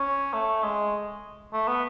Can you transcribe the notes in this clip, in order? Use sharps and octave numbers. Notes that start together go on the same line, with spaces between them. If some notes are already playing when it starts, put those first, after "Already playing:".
Already playing: C#4
A3
G#3
A3
B3